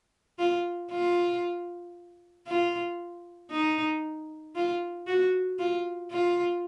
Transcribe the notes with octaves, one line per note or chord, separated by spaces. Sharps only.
F4
F4
F4
D#4
F4
F#4
F4
F4